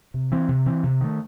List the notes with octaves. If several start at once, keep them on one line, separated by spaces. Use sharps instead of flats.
C3
E3 C4
C3
E3 C4
C3
D#3 A3